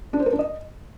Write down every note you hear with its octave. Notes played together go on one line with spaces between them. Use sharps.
D4
C5
A#4
D4
D#5